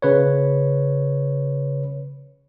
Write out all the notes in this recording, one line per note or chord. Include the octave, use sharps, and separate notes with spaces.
C#3 B4 C#5